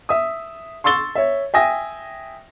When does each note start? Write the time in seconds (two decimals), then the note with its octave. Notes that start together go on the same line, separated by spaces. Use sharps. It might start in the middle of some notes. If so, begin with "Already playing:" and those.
0.09 E5 D#6
0.84 C6 C#6 E6 A6 G7
1.15 C#5 E5
1.54 E5 G5 G#5 D#6 A#6